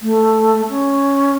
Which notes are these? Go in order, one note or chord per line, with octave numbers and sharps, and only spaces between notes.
A3
C#4